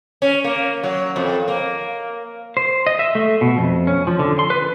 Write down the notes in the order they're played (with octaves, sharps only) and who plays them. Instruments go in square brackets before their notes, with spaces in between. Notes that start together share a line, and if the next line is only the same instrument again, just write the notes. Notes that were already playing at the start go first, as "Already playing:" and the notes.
[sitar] C#4
A#3
F#3
F2
A#3
[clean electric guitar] C5
D#5
E5
A3
B2
F2
C#4
F3
D3
C6
B4